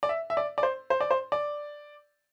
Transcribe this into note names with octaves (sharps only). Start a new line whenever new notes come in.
D5
E5
E5
D5
D5
C5
C5
D5
C5
D5